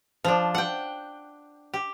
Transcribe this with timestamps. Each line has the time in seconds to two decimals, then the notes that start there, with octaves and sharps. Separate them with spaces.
0.24 F3 D4
0.55 F#5 G5
1.74 G4